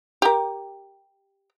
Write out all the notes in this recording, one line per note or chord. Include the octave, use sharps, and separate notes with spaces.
G4 A#4